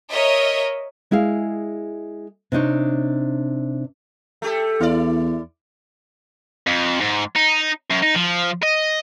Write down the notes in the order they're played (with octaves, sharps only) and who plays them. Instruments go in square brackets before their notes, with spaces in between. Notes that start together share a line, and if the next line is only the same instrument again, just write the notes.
[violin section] A#4 C#5 D#5 E5
[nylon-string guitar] G#3 E4 G#4 F5
C3 D4 D#4 C#5
[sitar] A3 G4 A4
[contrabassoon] E2 [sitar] E4 D5
[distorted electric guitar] F2
G#2
D#4
F#2
D#4
F3
D#5